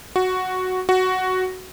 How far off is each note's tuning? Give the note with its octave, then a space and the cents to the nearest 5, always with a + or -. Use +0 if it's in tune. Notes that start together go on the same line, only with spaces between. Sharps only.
F#4 +0
F#4 +5